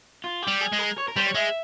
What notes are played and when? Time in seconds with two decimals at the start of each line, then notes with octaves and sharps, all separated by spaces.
0.24 F4
0.42 G4
0.48 G3
0.61 G#4
0.73 G#3
0.79 A#4
0.98 C#5
1.08 A#4
1.16 G3 C5
1.26 C#5
1.34 G#3 E5